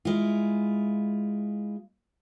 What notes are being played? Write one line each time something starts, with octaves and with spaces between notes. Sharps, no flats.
G#3 E4 F4